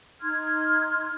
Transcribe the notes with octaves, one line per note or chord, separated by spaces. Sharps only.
D#4 C6 F6 G#6